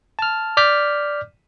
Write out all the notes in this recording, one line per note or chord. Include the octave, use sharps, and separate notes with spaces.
A5 F6
D5 D6 F6 G6 B6